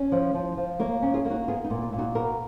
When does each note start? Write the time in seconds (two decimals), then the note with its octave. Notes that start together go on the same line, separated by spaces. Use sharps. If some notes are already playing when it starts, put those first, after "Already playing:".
Already playing: C#4
0.12 F3
0.34 F3
0.57 F3
0.80 A#3 A#4 C#5
1.02 C#4
1.14 F4 G#4
1.25 A#3
1.30 D#4 F#4
1.48 B3 F4 G#4
1.64 D#4
1.70 A#2
1.82 F4
1.93 A#2
1.98 D#4 F#4
2.15 B3 F#4 A#4